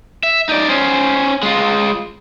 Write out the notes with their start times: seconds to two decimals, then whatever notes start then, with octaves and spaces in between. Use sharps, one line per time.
0.23 E5
0.49 D#4 D5
0.70 C#4 C5
1.43 G#3 F4